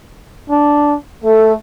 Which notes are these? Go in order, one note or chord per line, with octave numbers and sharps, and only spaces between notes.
D4
A3 A4